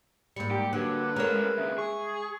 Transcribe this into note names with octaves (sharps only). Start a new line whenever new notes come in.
G#2 G3 A#3 C#7
D#4 G4
D3 F#3 A#3 G4 B4
G#3 A3 C#4 A#4 C#5 A#5
D#2 C#3 E5
G#4 C#6